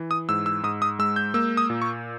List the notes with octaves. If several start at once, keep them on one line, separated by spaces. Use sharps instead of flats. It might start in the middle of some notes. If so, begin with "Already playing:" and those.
Already playing: E3
D#6
G#2 E6
E6
G#2 D#6
D#6
G#3 E6
G6
A#3 E6
D#6
A#2
C#6